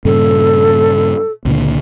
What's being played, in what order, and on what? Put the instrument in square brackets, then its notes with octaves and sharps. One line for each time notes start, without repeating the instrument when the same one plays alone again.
[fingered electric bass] G2 A#2 C#3 [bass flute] A4
[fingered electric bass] C#2 A#2 D3